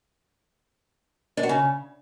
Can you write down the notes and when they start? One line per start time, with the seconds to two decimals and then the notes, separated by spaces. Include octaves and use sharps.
1.37 D4
1.43 F#4
1.49 C#3